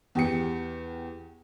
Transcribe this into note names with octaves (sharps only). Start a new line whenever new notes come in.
E2 G4 C#7